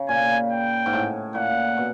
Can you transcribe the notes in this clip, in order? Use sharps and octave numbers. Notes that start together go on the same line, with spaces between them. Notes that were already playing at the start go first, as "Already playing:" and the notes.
Already playing: C#3
A#2 G#5
G5
G#2
A2
A#2 F#5
B2